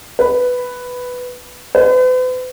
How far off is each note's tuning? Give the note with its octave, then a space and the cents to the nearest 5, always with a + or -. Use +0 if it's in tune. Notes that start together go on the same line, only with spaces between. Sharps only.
B4 +5
B4 +45